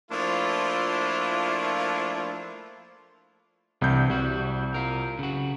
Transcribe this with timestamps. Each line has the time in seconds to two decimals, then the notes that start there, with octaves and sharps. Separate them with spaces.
0.11 F3 A3 A#3 D4 E4 F4
3.82 C2 C3 E3 C4 G6
4.10 C2 G3 F#4
4.74 F4 A#4
5.19 C#3 F#4